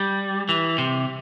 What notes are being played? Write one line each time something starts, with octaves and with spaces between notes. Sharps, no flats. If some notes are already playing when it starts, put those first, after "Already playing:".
Already playing: G3
E3
C3